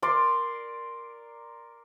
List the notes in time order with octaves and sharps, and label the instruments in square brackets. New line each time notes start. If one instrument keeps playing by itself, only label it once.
[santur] A#4 D5 C6